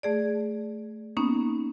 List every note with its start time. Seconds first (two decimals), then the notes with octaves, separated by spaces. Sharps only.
0.03 A3 G#4 D5
1.17 A#3 B3 C#4 D#4